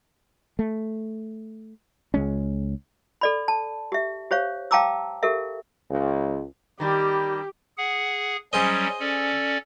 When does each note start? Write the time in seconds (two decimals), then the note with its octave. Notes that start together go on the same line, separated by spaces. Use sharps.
0.59 A3
2.14 C#2 G#3 C#4
3.21 A4 D5 B5
3.48 A5
3.92 G4 E5
4.31 G4 C5 C#5 F5
4.71 F5 G5 A5 A#5 D6 E6
5.23 G4 A4 A#4 E5
5.90 C#2
6.80 D#3 G3 G4
7.78 G#4 F#5
8.53 F#3 G3 C#4 G#4 C5 D#5
9.00 C#4 A4 D5